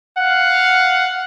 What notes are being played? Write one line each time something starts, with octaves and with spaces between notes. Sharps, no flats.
F5 F#5